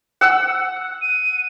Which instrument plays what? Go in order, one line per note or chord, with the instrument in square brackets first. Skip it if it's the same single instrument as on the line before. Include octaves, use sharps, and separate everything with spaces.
[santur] F#5 E6
[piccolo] D#7